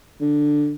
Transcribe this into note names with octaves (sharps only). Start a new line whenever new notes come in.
D3